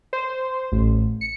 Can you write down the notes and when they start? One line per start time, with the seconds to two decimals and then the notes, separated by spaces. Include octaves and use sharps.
0.13 C5
0.72 A1
1.21 C#7